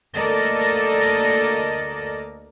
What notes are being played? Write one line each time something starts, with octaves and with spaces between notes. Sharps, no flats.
D2 A#3 A4 A#4 D5 D#5